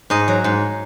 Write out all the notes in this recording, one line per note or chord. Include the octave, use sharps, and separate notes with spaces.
G#2 D#5
F#3
G#2